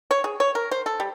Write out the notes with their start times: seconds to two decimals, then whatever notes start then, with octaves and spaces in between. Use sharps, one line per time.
0.11 C#5
0.24 G#4
0.40 C#5
0.55 A#4
0.71 C5
0.86 A4
1.00 G3